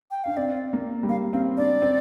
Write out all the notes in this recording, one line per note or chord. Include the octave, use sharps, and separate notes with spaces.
G5
D4 F5
C4 D5
A#3
G3
A#3 F5
C4 F5
D4 D5
C4